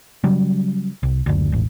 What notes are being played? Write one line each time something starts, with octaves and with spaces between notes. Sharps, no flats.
C#3 F#3 G3
C2
F#1 D2
E1 A1